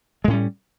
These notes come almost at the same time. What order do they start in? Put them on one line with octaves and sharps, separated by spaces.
G#3 A2 C#4 G3